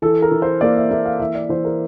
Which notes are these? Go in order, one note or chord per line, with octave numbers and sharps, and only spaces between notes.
E3 A4
A#4
E3
C5
A#3 D5
E5
A#3 E5
F5
E3 E5
D5
E3 C5
A#4